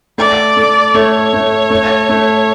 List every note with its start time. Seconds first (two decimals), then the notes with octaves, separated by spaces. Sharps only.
0.18 A3 D5
0.57 A3
0.94 A3 C#5
1.33 A3
1.70 A3
2.09 A3